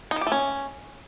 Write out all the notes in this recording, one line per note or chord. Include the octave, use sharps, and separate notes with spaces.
D#4
D#3
G4
A3
C#4